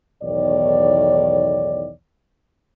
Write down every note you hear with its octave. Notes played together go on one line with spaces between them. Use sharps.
B1 E2 A2 D#3 C#5 D5